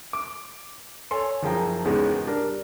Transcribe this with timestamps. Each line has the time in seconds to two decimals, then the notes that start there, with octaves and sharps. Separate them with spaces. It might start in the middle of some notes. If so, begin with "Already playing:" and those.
0.13 D6
1.11 A4 C#5 G#5 C6
1.43 F#1 F3 G#4 G5 A#5
1.85 G#1 E2 C#3 G#3 D#4
2.26 G3 D4 A#4